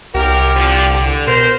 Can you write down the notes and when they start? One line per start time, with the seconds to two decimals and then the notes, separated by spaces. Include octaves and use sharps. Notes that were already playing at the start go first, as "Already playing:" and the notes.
0.15 C2 F#2 G4 A#4
0.55 D3 F3
0.92 D3
1.27 B2 A#4 C5